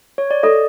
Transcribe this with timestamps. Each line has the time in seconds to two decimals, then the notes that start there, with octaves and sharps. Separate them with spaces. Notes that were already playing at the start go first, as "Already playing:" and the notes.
0.18 C#5
0.31 D5
0.43 A4 D#5